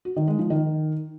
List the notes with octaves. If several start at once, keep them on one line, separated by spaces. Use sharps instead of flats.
F#4
D#3
G#3
F3
D#3